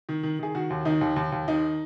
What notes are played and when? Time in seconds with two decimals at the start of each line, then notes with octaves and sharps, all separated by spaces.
0.09 D#3
0.23 D#3
0.39 D#3 G#4
0.55 D#3 F#4
0.70 D#2
0.85 D#3 D#4
1.01 D#2
1.16 D#2
1.32 D#2
1.48 D#3 D#4